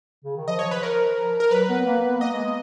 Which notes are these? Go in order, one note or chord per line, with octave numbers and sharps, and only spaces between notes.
C#3
D#3
F3 D#5
C#5
F3
B4
A#4
A#4
F#3 B4
B3
B3
A#3
B3
A#3 D#5
G#3
G#3